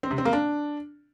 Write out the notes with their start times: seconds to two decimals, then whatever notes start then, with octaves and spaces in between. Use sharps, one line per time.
0.03 C4
0.11 C3
0.18 C4
0.25 A#3
0.33 D4